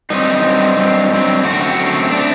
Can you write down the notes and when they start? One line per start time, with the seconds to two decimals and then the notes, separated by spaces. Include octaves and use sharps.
0.10 G2 F#3 C4 D#4
0.43 G2 F#3 C4
0.77 G2 F#3 C4
1.11 G2 F#3 C4
1.44 F#2 D3 A3 C4 F#4
1.77 F#2 D3 A3 C4
2.11 D3 A3 C4 D4